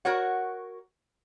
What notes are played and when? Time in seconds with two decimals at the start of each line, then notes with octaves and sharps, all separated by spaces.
0.05 F#4 A#4 C#5 F#5